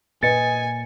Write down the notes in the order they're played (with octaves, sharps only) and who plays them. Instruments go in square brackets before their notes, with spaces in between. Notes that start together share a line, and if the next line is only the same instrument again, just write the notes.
[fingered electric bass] A#2 [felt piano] B4 D#5 [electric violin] G#5 [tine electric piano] A6 C#7